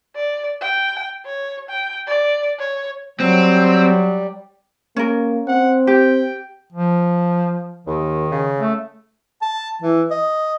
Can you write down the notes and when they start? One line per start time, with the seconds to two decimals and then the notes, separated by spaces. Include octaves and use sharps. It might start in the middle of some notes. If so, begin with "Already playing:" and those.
0.16 D5
0.61 G5
1.26 C#5
1.70 G5
2.07 D5
2.59 C#5
3.20 F#3 G3 C4
4.96 A#3 C#4 A#4
5.47 C4 F#5
5.87 G4 G5
6.73 F3
7.87 D#2 D#3
8.32 C#3
8.60 A3
9.42 A5
9.82 E3
10.11 D#5